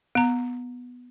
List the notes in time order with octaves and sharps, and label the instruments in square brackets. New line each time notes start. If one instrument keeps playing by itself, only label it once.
[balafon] B3 A#5